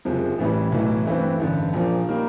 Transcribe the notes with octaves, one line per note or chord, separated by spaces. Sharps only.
F#1 F2 C3 F3 G#3
A1 A2 E3 G3
B1 A2 E3 A3
G2 E3 A3 C4
A1 G2 D3
A#1 A#2 F3 A#3
D#3 G3 A#3